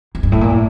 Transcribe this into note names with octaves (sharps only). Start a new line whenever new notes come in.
F2
G2
A2
A#2
A2